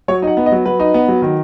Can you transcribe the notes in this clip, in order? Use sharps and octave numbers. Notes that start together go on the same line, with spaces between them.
F#3 C#5
D#4 F#5
B3
D#5
F#3
F#3 B4
D#4
B3
F#3
D#3